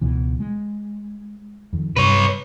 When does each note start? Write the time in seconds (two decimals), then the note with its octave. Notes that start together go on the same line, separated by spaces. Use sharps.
0.01 C#2 B2 E3
0.40 G#3
1.73 F2 D#3
1.97 G2 C3 B4 C#5